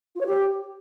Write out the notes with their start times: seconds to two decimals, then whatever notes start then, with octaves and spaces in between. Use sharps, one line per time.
0.15 F4
0.20 C#5
0.26 G4